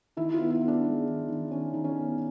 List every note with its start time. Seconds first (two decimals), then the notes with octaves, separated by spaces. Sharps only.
0.17 D#3 E4
0.34 F4
0.39 B3
0.50 E4
0.61 B3
0.68 D4
0.84 G#3
1.07 D#3
1.29 D#3
1.51 D#3 C#4
1.74 D#3
1.84 C#4
1.96 B3